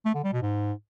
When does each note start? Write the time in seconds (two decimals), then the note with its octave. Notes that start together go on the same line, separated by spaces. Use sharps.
0.05 A3
0.15 D3
0.24 G3
0.33 B2
0.42 G#2